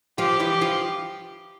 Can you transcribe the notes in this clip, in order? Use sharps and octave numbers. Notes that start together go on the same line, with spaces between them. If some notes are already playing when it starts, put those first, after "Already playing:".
F3 F4 G4
E3 E4
F3 F4